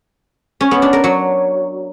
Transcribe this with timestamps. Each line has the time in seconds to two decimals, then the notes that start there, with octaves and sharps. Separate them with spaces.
0.61 C#4
0.71 B3
0.82 D4
0.93 A#4
1.04 F#3